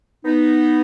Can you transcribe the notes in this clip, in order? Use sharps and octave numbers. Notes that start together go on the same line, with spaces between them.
B3 D#4